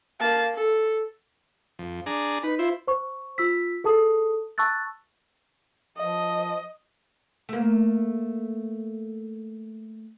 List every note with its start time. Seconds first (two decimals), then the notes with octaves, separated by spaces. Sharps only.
0.20 A#3 A5
0.54 A4
1.79 F2
2.06 D4 G#4 A#5
2.43 D#4 B4
2.59 E4 F4 C5
2.87 C5 C#6
3.38 F4 E6 B6
3.84 G#4 A4 A5 D#6
4.58 A5 C#6 E6 F#6 A6
5.97 F3 D#5
7.49 A3 A#3